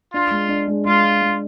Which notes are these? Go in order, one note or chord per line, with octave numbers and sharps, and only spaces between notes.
D4 F4
G#3
D4
G#3
G#3 F4
G#3
G#3